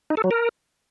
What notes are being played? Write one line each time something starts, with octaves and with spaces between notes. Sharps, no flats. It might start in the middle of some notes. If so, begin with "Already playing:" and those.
D#4
A4
F#3
A#4